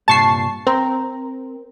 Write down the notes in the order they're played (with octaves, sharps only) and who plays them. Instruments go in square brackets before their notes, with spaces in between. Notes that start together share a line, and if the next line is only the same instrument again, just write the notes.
[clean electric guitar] C2 G2 A#2 [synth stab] A5 C#6 C7
[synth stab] C4 [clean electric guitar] A#4